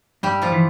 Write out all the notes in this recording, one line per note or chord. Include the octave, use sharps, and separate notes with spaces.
G2 G3 G4
F3 F4
E3